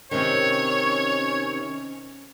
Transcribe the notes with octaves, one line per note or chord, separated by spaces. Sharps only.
C3 D#3 C#4 C#5